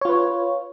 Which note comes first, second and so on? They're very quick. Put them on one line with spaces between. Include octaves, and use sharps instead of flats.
C#5 F4 B4